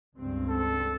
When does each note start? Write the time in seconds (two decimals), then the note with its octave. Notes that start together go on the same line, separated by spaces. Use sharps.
0.16 C#2 G2 C4
0.49 A4